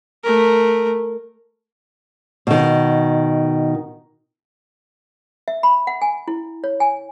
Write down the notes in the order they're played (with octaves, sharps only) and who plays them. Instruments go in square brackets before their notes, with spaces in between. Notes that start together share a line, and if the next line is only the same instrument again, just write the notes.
[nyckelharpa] A3 A#4
[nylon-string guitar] B2 D#3
[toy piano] E5
B5
F#5
G#5
E4
C#5
G#5